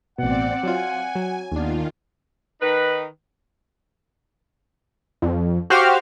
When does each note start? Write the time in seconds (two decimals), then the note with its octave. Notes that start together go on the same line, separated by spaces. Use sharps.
0.18 A1 B2 C4 D5 F#5
0.63 F#3 F4 G#5
1.15 F#3
1.52 D#2 D#3 B3 D4 F4
2.61 D#3 D#4 B4
5.22 F2
5.70 F#4 G4 C5 F5 G5 F6